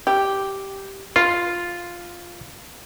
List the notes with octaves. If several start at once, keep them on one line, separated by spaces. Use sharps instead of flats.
G4
F4 C6